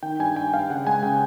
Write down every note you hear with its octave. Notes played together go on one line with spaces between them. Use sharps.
D#3 G5
G2 G#5
G2 G5
G2 F5
C#3 F#5
G#3 G#5
C#3 G5